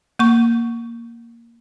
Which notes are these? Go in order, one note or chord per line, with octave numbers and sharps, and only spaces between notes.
A#3 C#6